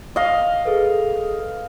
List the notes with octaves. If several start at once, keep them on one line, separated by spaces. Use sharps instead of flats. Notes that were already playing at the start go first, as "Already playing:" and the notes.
D#5 F5
G#4 A4 B4